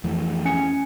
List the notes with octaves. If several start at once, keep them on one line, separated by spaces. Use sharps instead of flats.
F2 E3 A3
C#4 G#5 C#7